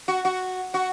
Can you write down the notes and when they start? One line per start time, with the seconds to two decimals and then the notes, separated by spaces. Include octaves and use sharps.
0.08 F#4
0.25 F#4
0.74 F#4